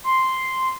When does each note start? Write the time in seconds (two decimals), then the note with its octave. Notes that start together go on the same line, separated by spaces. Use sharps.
0.04 C6